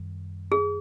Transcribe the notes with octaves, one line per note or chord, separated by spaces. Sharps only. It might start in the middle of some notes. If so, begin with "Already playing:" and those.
Already playing: F#2 D#3 G3
G#4